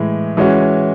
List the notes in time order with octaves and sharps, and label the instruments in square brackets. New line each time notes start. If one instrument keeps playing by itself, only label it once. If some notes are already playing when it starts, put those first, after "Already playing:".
Already playing: [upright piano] A2 E3 G#3
E3 G#3 C#4 F#4